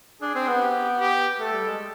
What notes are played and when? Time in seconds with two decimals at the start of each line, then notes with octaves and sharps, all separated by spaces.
0.22 D4 G#4
0.35 C4
0.47 B3
0.61 G4
1.00 G4
1.40 A3 A4
1.53 G3
1.67 G#3